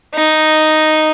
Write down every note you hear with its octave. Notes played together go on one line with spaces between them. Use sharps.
D#4